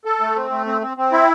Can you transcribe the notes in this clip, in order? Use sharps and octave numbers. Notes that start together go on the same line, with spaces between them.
A4
A3
C4
A3
C4
C4
C4
E4